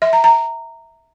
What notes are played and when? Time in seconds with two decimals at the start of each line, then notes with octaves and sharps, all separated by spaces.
0.02 E5
0.13 A#5
0.24 A#5